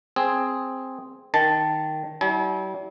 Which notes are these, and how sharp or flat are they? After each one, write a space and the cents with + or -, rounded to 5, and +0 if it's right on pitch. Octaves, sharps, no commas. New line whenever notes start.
C4 +0 G#4 +0
D#3 +0 A5 +0
G3 -45 E4 -35 G#5 +45